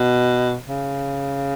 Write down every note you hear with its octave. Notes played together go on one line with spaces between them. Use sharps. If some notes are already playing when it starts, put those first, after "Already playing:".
Already playing: B2
C#3